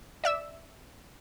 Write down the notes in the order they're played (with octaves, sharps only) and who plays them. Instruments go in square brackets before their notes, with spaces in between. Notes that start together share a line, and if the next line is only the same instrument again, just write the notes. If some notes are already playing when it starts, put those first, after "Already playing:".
[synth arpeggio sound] D5 E5 E6